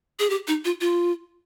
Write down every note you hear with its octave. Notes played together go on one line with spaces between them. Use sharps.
G#4
G4
D#4
F4
F4